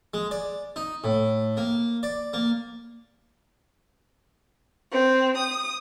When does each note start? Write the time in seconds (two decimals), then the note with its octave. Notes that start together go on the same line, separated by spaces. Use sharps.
0.14 G#3
0.31 D5
0.76 D#4
1.04 A2
1.57 A#3
2.03 D5
2.33 A#3
4.91 C4
5.37 D#6